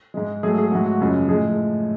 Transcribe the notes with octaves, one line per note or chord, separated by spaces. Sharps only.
G#2 G#3
G#2 F#3 A3 G#4
G#4
G#2 F#3 A3 F#4
F#4
F#2 C#3 F3 G#3
A2 F3 G#3 G#4